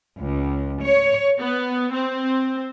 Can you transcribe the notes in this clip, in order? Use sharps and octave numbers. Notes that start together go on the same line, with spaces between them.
C#2
C#5
B3
C4